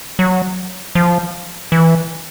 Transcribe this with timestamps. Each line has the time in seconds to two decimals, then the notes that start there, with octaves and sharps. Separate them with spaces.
0.19 F#3
0.95 F3
1.72 E3